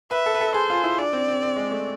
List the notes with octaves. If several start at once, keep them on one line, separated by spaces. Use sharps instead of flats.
B4 E5
A4
B4
A4
G#4 C5
F4
E4
D4 D5
C4
C4
C4
G#3
A3